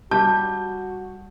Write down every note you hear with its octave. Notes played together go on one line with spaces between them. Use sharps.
G3 F#4 A5 G6